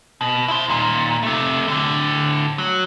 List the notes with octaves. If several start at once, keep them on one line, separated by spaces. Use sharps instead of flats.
B2
E4 C5
D#2 A#2
C3 A3
A2 D3
F#3